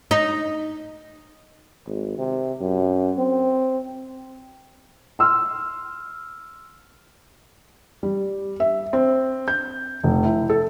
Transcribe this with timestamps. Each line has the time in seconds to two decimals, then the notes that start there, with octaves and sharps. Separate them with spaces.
0.11 D#4
1.87 G#1
2.18 C3
2.61 F#2
3.18 C4
5.19 C6 E6 F6
8.03 G3
8.60 E5
8.93 C4
9.48 G6
10.03 F1
10.24 E4
10.50 A4